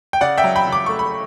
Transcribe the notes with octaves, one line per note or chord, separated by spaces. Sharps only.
G5
C#3 D5 F#5
E5 G5
F#3
G5 B5
C#3
D6
A3 C#6
B5